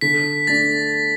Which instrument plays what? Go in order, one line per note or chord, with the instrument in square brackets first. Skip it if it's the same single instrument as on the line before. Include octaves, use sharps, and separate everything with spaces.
[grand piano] D3 [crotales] B6
[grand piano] A3 D4 [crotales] A6